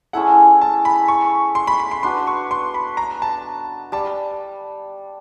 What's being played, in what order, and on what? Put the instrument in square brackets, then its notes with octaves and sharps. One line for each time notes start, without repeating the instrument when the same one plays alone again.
[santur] G#3 C#4 E4 A4 [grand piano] F#5
[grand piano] A5
B5
C#6
C6
B5
B5
C6
[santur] D4 F#4 B4 [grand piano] C6
[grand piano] C#6
C6
B5
A#5
A5
[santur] G3 [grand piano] A5